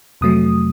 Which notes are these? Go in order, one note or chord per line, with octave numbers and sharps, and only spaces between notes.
F2 C3 F#3 A3 D#6